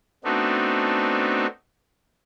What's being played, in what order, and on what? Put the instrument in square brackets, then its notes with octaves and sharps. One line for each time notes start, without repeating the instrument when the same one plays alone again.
[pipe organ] A3 B3 C4 D4 D#4 F#4